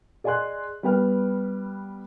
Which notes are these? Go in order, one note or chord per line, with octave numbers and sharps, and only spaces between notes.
G#4 D5 D#5 G#5 C6 F#6
G3 B3 B4 G5 F6